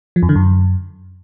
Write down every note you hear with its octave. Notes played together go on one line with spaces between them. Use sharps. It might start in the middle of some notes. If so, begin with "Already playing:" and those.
F3
F2
D3
F#2